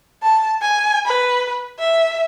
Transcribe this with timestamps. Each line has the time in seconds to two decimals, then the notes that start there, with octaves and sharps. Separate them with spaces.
0.23 A5
0.62 G#5
1.06 B4
1.79 E5